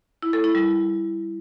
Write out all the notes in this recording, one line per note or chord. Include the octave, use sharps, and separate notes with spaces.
E4
A4
E4
G3